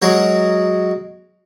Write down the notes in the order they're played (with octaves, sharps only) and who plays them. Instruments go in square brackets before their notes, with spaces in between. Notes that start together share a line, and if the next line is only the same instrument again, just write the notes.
[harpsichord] F#3 G#3 F#4 A#4